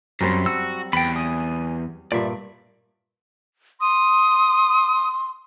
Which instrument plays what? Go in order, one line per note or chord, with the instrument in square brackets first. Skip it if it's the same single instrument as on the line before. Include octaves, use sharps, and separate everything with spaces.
[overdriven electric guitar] F#2 [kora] F#3 G3 C4
[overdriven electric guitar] F#4 [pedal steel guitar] E6
[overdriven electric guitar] E2 [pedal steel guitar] G5 B5
[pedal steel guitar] G#5 D#6
[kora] G2 A#2 [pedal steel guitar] D5 E5
[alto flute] C6 [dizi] D#6